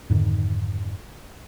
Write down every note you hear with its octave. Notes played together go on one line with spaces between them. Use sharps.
F2 G#2 D3 D#3